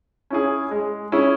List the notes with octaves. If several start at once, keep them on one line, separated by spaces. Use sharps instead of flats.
C#4 E4 G#4
G#3
C#4 E4 G#4